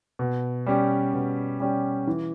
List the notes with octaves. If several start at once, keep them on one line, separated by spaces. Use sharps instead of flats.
B2
G3 C#4 G4
B2
G3 C#4 G4
E3